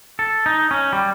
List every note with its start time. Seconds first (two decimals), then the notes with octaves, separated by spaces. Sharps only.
0.19 A4
0.46 D#4
0.71 C#4
0.93 G3